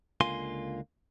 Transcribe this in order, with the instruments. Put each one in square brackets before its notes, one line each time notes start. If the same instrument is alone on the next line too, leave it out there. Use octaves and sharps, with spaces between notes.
[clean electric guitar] C#2 D3 A#3 F4 G#5 C6